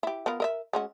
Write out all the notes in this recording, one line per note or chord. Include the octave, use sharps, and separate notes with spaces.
E4 G4
B3 F4 A#4
A#4 D#5 E5
G#3 C#4 F#4